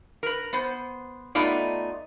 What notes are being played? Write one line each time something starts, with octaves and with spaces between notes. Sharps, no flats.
A#4 B4
B3 C5
A3 B3 D#4 F4 D5